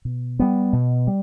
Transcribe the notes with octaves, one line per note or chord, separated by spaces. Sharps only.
B2
G3 B3
B2
G3